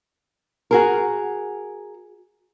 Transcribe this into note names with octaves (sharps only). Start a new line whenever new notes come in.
F#4 G#4 A#4